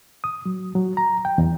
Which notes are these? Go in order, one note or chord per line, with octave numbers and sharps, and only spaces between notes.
D#6
F#3
F#3
A#5
G5
E2